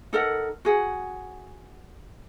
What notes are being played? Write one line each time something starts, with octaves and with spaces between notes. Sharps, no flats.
D#4 A4 A#4 F#5
F#4 G#4 F#5